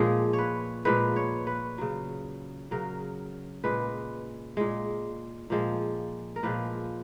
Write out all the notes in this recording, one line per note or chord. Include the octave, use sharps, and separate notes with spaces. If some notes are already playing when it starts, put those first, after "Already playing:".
Already playing: A#2 F3 G#3 G#4
C#5
B4
A#2 F3 G#3 B4
C#5
B4
C#3 F#3
C#3 F#3 A#4
A#2 G#3 B4
A#2 G#3
A#2 F3 G#3
A#4
A#2 F3 G#3 B4